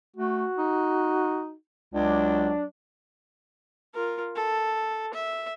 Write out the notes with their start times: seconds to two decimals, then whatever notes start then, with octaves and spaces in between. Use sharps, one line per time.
0.16 A3 F#4
0.58 D#4
1.94 C#2 F#3 D4
3.94 F4 A#4
4.36 A4
5.14 E5